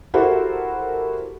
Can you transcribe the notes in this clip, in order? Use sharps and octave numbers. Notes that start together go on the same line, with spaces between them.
E4 F#4 G4 A4 A#4 C5